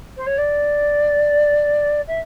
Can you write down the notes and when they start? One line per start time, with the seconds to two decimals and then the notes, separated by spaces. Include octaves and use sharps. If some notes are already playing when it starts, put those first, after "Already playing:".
0.17 C5
0.26 C#5
0.38 D5
2.07 E5